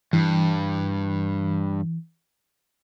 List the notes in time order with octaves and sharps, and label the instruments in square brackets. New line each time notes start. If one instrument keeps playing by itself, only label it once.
[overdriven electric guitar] G2 [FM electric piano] E3